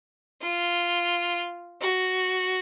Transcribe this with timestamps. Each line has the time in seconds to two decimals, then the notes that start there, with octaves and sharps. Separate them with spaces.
0.42 F4
1.81 F#4